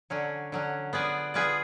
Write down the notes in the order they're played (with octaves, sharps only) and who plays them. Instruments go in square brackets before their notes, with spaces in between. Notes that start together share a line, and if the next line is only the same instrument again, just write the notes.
[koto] D3 F#3 C#4
D3 F#3 C#4
B3 F4 G#4 B4 D5
B3 F4 G#4 B4 D5